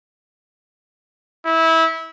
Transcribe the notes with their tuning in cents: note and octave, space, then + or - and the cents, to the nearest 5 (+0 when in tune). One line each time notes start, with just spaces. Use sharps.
E4 -20